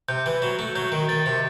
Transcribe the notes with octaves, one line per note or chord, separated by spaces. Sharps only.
C3 G6
E3
F#3 E7
A3
F#3 G6
D#3
D#3 A6
C3